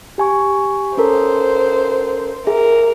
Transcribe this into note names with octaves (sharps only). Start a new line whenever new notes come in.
G4 G#5 C#6
C#4 A4 A#4 C5
G#4 A#4 E5